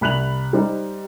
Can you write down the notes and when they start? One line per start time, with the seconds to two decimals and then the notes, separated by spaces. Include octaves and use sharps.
0.01 C2 B5 F#6 F7 F#7
0.53 G3 D#4 C5